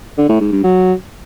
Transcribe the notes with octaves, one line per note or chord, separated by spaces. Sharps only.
D3
A2
G#2
G2
F#3